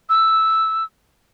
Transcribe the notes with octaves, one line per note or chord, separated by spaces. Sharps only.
E6